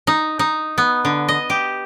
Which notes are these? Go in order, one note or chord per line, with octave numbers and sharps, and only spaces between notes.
D#4
D#4
B3
D3
D#5
G4